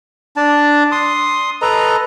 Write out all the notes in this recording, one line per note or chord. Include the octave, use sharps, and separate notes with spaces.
D4 A5
C6 D#6
A4 B4 D#5 A#5